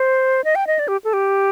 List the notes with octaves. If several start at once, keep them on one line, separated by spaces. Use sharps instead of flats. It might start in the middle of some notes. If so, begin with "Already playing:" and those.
Already playing: C5
D#5
G5
D#5
D5
G4
A4
G4